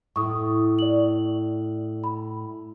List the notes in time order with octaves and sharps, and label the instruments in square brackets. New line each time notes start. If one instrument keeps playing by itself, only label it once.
[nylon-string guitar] A2 [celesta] C#6 D#6
[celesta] D5 F#7
B5